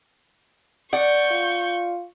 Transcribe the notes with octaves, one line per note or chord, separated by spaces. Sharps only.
D5 F#5 C#6 G6
F4